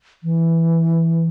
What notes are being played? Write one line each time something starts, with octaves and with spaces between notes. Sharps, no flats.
E3